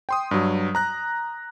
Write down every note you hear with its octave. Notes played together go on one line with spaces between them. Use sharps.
G5 C6 D#6
G2 F#3
A#5 F#6 A#6